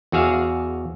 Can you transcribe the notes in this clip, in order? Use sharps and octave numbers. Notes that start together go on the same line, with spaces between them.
E2 F#4 G#4 E5 F5